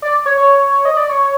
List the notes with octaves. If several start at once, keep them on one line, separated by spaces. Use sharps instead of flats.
D5
C#5
C#5
D#5
D5
C#5